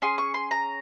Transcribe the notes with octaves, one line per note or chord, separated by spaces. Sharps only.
C#4 G#4 C6
C#6
C6
A#5